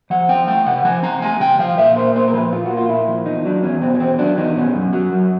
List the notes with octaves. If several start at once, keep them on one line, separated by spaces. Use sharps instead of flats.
F3 F#5
C4 G5
A3 G5
C3 F#5
F3 G#5
C4 A#5
A3 G#5
C3 G5
F3 F5
A#2 E5
A#3 C5
A#2 C5
A#4
F3 B4
A#2 F4
F#4
A#3
F4
A#2 E4
F3
E2 D#4
F#3 D4
E2 C#4
B2 C4
C#4
E2 C4
F#3 D4
E2 D#4
B2 C#4
F#2
F#3
F#2